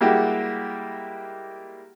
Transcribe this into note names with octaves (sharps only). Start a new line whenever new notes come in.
G3 G#3 A#3 E4 F#4 G4